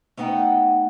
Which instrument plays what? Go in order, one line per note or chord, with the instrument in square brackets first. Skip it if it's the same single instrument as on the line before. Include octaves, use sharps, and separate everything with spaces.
[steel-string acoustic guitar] A3 B3 D#4 F#5 G5